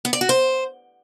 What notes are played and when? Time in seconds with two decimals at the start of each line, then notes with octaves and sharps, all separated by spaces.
0.05 B3
0.13 D5
0.21 F#4
0.29 C5